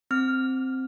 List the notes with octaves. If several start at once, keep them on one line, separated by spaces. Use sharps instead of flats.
C4 F6